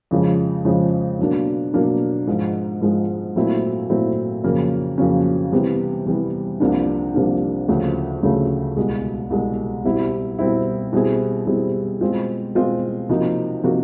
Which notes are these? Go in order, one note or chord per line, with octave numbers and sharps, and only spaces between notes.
F2 C#3 F3 G#3
F2 C#3 F3 G#3
B2 F#3 A#3 D4
B2 F#3 A#3 D4
G#2 F3 G#3
G#2 F3 G#3
A#2 F#3 A3 C4 E4
A#2 F#3 A3 C4 E4
F2 C#3 F#3 A#3 C#4
F2 C#3 F#3 A#3 C#4
C3 E3 G3 B3
C3 E3 G3 B3
C2 C3 F3 A#3 D4
C2 C3 F3 A#3 D4
D2 C#3 F3 A3
D2 C#3 F3 A3
C2 B2 G#3
C2 B2 G#3
B2 G3 C4 E4
B2 G3 C4 E4
B2 G3 C4 E4 G#4
B2 G3 C4 E4 G#4
B2 G#3 C4 F4
B2 G#3 C4 F4
C3 F3 A#3 D#4 F#4
C3 F3 A#3 D#4 F#4